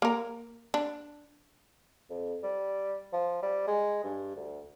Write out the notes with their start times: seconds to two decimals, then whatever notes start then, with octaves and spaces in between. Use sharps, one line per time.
0.02 A#3 A#4
0.74 D4
2.10 F2
2.43 G3
3.13 F3
3.42 G3
3.67 G#3
4.04 G2
4.36 D2